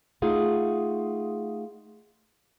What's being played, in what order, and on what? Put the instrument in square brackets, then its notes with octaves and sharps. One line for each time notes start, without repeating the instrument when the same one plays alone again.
[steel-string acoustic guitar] A3 D#4 F4 G#4 F5 F#5